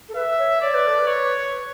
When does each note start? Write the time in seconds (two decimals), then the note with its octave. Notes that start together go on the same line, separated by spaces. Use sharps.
0.09 A4
0.15 B4 E5
0.39 C#5
0.61 C#5 D5
0.74 B4
0.87 A4
0.99 B4
1.07 C#5